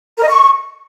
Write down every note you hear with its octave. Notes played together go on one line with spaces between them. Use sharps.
A#4
D#5
C#6